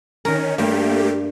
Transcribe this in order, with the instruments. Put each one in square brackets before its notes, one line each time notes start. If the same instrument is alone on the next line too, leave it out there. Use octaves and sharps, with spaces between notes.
[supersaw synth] D#3 C#4 [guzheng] A#4
[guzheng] G2 [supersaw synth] A3 A#3 G4